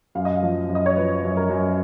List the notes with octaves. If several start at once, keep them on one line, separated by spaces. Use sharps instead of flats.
F#2 F5
D#5
F5
F3
F#2
D#5
C#5
F3 B4
F#2
A#4
F#2